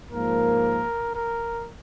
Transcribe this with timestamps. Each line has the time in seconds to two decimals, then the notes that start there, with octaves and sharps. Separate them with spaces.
0.11 G#2 F3 A#3 A#4
1.15 A#4